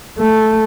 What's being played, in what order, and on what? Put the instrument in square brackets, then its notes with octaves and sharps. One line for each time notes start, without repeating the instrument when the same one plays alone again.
[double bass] A3